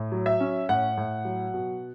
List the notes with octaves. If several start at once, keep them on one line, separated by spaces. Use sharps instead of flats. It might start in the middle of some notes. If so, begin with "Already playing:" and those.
Already playing: A2
F#3
E5
C#4
A2 F#5
A2
F#3
B2